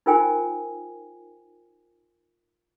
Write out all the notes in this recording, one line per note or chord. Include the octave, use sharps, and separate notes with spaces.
D#4 F4 A#4 C5 G5 G#5